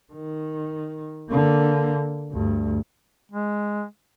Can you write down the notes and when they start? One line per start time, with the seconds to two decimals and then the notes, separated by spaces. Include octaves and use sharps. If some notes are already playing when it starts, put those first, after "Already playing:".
0.13 D#3
1.30 D3 A#3
2.32 D2 G2
3.32 G#3